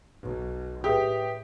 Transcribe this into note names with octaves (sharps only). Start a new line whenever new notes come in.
B1
A2 G4 G#4 B4 E5 D#6